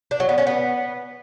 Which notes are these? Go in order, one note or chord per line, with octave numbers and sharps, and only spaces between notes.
D4
F#3
B3
C#4
B3